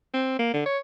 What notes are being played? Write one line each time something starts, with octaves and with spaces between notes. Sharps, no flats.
C4
A#3
D3
C#5